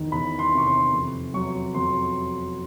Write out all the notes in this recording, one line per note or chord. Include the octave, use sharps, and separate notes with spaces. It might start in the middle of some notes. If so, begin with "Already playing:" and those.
Already playing: E2 D#3
E2 B5
C6
C3 C#6
C6
F2
F#3 C#6
F2 C6